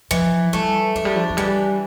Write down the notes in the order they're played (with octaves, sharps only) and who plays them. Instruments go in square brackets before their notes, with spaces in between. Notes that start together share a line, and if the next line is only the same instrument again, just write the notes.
[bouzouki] E3 [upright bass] F3
[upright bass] G3 [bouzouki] A3
[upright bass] F3 [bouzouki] D4
[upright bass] G3
F3
F3
[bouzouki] E3 [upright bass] G3